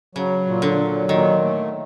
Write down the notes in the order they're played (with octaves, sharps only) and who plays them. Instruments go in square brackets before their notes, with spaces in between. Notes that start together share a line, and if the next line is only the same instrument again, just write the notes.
[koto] C#3 [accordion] F#3
[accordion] A#2
[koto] D3
[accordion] F#3
[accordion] A#2 [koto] D#3
[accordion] A3